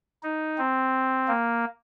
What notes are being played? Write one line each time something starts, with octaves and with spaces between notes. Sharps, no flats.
D#4
C4
A#3